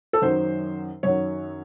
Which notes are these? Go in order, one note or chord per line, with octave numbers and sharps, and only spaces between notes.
A4
F#2 D#3 F#3 C5
F#2 D#3 F#3 C#5